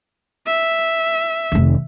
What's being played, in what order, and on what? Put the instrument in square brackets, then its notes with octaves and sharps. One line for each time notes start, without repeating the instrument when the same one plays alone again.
[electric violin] E5
[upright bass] F1 D#3